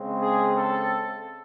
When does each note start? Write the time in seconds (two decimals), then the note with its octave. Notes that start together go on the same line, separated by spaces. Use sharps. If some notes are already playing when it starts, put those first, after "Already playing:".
Already playing: C#3 G#3 C4
0.22 G#4
0.56 A4